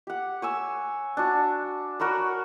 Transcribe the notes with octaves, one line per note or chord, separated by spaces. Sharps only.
G4 F#5
C#5 G#5 E6
D4 F#4
F#4 A#4 C#5 B5